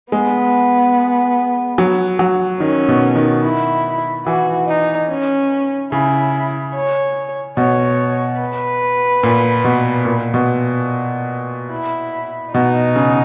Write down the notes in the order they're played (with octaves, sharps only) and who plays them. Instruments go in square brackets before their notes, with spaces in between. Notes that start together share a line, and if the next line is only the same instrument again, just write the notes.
[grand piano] G#3 [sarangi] B3
[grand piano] F#3
F#3
[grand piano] D#3 [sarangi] C#4
[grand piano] B2
D#3
[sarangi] E4
[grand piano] E3 [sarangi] F#4
[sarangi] D#4
C#4
[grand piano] C#3 [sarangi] E4
[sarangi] C#5
[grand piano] B2 [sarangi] C#5
[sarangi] B4
[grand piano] A#2
B2
A#2
B2
[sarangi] E4
[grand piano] B2 [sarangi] D#4
[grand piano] C#3